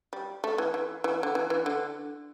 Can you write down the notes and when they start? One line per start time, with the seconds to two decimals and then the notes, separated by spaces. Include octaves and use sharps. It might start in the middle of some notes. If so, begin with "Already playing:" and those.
0.13 G3
0.44 A3
0.58 E3
0.74 E3
1.04 E3
1.23 D3
1.35 E3
1.50 E3
1.66 D3